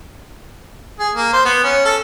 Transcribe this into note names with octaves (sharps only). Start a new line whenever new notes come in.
G#4
A#3
C5
B3
C#4
A4